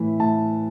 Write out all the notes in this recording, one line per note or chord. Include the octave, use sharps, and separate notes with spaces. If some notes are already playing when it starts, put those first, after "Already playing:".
Already playing: A2 E3
A2 A5